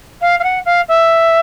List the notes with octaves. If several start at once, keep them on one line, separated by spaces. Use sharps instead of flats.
F5
F5
F#5
F5
E5